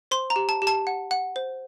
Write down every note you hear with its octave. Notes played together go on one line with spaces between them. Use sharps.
C5 C6
A#5
G4
A5
G4
A5
F#5
F#5
C5